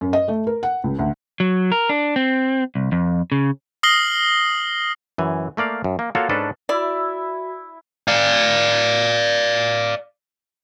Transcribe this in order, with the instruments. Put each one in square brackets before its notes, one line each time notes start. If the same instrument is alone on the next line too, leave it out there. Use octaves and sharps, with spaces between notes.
[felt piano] F#2
D#5
A3
A#4
F#5
C#2
D2
[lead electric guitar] F#3
A#4
D4
C4
C2
F2
C#3
[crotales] D#6 F6 A#6 C7 F#7 G7
[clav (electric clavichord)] F#2 E3 G#5
A3 A#3 D5 F5
F#2
A#3
A#3 F4 F#4 A4 C#5 F5
G#2 C#4 D4 A4 B4
[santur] E4 E5 [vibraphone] F#4 B5 [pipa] D5
[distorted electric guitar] D5 F5